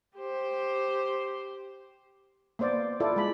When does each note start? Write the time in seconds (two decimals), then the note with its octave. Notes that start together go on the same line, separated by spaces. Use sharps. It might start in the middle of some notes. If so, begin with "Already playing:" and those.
0.17 G4 C5
2.59 A#3 B3 C5 D5
3.00 E4 F4 A4 D5
3.16 G#3 B5